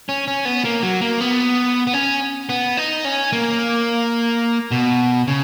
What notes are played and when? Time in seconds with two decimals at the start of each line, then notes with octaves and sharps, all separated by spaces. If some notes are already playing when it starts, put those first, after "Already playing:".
0.09 C#4
0.28 C#4
0.45 B3
0.65 A#3
0.83 F#3
1.01 A#3
1.20 B3
1.87 B3
1.94 C#4
2.49 B3
2.77 D#4
3.05 C#4
3.33 A#3
4.71 B2
5.27 C#3